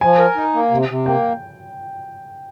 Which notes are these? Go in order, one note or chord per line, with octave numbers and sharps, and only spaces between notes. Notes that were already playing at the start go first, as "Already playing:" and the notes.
F3 G#5
A#4
D#4
A#3
C3
C3
A#3 G5